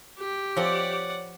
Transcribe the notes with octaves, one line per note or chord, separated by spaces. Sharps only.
G4
F3 C4 C#5 D5 F#5